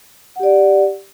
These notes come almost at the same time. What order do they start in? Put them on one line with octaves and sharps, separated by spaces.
F#5 G4 D5